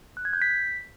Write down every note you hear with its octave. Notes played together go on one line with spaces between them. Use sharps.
F#6
G#6
G6
B6